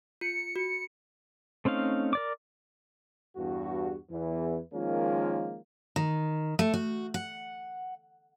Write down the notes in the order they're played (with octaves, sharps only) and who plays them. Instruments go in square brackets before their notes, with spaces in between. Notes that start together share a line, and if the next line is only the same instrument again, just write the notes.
[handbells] F4 [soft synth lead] C#7
[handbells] F#4
[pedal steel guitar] A3 C4 C#4 D#4 F5
A#4 D5 D6
[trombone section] E2 G2 F#4
E2 E3
D#3 F3 G#3 A#3 C#4 F4
[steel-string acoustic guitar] D#3
A3
F#4
F#5